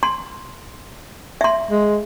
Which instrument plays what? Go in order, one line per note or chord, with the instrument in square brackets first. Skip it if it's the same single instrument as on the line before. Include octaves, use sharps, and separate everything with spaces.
[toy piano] C6
E5 C6
[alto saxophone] G#3